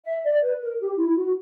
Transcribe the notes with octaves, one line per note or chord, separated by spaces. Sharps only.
E5
D5
B4
A#4
G4
E4
F#4